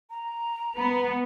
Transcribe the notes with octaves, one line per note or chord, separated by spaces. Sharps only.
A#5
B3